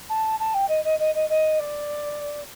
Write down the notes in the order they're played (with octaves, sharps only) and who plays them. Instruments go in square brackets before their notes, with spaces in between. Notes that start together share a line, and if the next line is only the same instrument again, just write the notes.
[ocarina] A5
A5
G5
D#5
D#5
D#5
D#5
D#5
D5